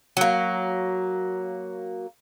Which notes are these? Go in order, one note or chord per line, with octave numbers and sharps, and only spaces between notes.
F#3 A#3